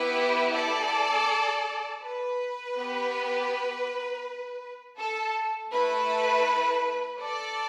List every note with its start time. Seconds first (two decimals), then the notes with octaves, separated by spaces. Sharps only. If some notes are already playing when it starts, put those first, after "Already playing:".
Already playing: B3 E4 G4 B4
0.54 A4 D5
2.02 B4
2.76 B3 G4
4.98 A4
5.72 A3 E4 A4 B4
7.20 A4 D5